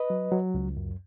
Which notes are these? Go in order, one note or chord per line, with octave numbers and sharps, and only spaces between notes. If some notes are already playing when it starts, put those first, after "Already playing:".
Already playing: B4 D#5
F#3
F#3
C#2
F#2